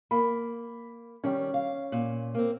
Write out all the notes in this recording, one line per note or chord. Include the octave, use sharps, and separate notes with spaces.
A#3 B5
D#3 G3 C#4 G5
F5
A#2
A#3 C4